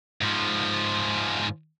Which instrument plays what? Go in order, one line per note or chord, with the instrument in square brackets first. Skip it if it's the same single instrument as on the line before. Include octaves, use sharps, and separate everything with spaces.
[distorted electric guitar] G#2 F3